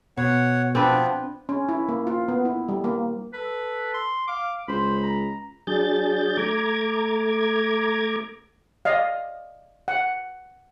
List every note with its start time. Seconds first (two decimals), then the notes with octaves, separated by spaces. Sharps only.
0.17 B2 C#5 F#5
0.75 F3 B3 C4 D4 B4
1.49 C#4
1.69 E4
1.89 A#3
2.07 F4
2.28 B3
2.45 E4
2.69 G3
2.84 A#3
3.33 A4 B4
3.94 C6
4.28 F5 D6
4.68 C#2 C5 B5
5.02 A#5
5.67 F#3 D4 G#4 G6 A6
6.37 A3 A#5 D6 G#6
8.85 D5 D#5 F5
9.88 F#5